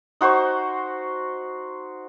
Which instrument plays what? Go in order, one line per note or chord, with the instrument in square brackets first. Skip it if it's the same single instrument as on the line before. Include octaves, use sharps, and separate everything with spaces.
[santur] D#4 F#4 C5 C#6